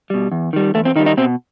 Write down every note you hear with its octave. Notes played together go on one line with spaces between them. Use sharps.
B2 G3
E2
D#3 G3
E2 A3
C4
D#3 G3 D#4
D#4
B2 C4